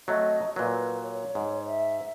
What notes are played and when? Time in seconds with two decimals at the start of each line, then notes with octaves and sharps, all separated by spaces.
0.08 F#3 A3 C4 D#5
0.56 A#2 F#3 B4
1.03 C#5
1.35 G#2
1.67 E5